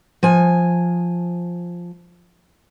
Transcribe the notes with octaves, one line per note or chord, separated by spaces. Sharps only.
F3 G#5